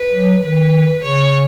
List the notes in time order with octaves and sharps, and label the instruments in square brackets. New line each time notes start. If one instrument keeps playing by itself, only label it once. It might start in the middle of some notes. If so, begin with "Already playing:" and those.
Already playing: [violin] B4
[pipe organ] F#3
[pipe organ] D#3 [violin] B4
[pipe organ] C#3 [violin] C#5